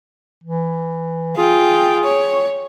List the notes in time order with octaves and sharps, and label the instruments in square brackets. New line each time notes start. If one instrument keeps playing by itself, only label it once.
[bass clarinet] E3
[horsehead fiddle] F4 G5 [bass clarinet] G#4
[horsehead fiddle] C#5